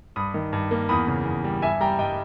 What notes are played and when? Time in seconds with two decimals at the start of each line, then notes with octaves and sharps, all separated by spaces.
0.16 G2 B5 D#6
0.34 D#3
0.53 G2
0.71 A#3
0.89 E2 B5 D#6
1.07 C#3
1.25 E2
1.44 G3
1.62 G2 E5 G#5
1.81 G3 G5 A#5
1.99 G2 D#5 G5